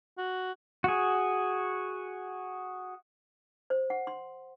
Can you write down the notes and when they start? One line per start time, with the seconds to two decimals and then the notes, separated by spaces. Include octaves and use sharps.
0.18 F#4
0.84 F#4 G#4
3.70 C5
3.90 F#5
4.07 C6